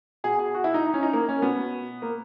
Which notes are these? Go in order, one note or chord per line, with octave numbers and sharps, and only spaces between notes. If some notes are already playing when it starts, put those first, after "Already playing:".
B2 G#4
G#4
F#4
E4
D#4
D#4
C#4
D#4
A#3
C#4
B2 B3
A#3